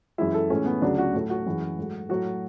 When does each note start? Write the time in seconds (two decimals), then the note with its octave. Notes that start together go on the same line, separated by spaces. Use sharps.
0.18 F#2 E3 G#3 E4
0.34 A4
0.50 A2 E3 G#3 C#4
0.66 B3
0.82 D2 C#3 F#3 D4
0.98 F#4
1.14 A2 F#3 A3
1.30 F#4
1.46 F#2 E3 G#3
1.78 G#2 F#3 A3
2.09 A2 F#3 A3 F#4